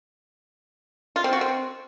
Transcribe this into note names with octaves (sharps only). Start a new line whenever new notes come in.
F4
C4
F#4
C4